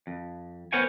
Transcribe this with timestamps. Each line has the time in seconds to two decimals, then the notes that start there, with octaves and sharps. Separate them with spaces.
0.07 F2
0.72 B3 A#4 C5 C#5 F#5 G#5